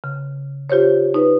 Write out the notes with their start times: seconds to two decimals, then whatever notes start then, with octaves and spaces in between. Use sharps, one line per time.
0.04 C#3
0.70 F4 G4 C5 C#5
1.14 D#4 B4